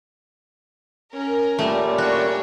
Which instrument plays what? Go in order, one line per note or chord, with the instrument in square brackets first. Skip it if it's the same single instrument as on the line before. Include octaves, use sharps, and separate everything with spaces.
[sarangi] C#4 [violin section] A#4
[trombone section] A#2 C#4 [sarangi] G3 [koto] A3
[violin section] D4 C#5 [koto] F#4